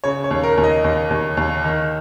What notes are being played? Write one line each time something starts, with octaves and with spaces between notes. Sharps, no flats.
C#3 C#5
C#5
D#2
A#4
D#2
D#5
D#2
D#2
D#2
D#3